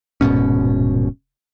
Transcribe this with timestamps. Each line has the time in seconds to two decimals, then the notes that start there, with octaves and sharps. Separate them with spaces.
0.21 D#1 G#2 B2 C#4